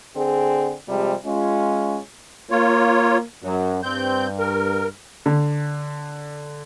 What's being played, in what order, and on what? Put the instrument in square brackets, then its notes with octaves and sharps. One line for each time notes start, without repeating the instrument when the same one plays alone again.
[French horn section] D3 C4 G#4
C3 F3 G3 G#3
G#3 C#4 F4
[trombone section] A#3 [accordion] F4 C#5
[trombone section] F#2 [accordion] F#3
[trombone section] G2 [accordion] C4 G6
[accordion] A#4
[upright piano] D3